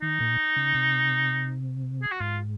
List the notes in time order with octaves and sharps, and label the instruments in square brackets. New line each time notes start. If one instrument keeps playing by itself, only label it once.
[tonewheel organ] D#3 [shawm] D#4
[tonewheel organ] A#2
C#3
C3
[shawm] G#4
F#4
[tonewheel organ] G#2 [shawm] F4